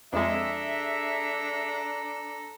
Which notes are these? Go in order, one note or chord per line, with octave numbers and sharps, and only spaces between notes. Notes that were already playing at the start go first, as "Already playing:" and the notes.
F2 G#3 D4 G#4 A4 E5 A#5